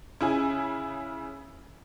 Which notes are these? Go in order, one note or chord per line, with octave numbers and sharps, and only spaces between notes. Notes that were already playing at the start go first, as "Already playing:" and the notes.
C#3 E4 G#5